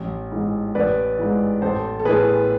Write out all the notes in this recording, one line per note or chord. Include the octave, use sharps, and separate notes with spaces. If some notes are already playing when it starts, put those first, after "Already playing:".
Already playing: A1
G#2 E3
A1 B4 D5
G#2 E3
A1 A4 C5
A4
A2 E3 G#4 B4